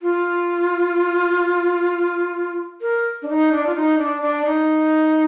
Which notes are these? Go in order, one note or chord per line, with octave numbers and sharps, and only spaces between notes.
F4
A#4
D4
D#4
D4
F4
D#4
D4
D4
D#4